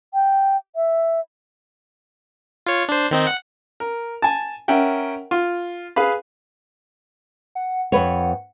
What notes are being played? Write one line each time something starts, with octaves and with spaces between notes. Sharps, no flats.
G5
E5
F4 C#5
D4 C5
D#3 C4 D#4
F#5
A#4
G#5 A5
C#4 A#4 E5 F#5 G5
F4
G#4 B4 F5 B5
F#5
F2 B4 C#5 F#5